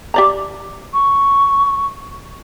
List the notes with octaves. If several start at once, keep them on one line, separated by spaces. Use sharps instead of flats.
G4 D5 A#5
C#6